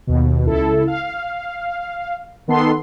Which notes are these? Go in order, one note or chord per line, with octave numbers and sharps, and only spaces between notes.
D#2 B2
C#2 E4 A4
F5
D#3 B3 A4 C6